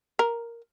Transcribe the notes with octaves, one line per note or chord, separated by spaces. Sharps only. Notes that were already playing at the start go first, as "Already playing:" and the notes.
A#4